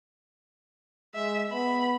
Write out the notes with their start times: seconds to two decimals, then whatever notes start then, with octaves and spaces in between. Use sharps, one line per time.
1.15 G#3 E5
1.51 B3 B5